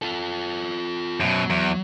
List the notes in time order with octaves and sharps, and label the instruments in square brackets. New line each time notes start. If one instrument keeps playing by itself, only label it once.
[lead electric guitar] F4 A4
[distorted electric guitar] F#2 B2 [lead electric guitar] F#3
[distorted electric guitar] E2